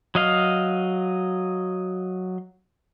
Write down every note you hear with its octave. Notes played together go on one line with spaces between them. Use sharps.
F#3 D#5 F5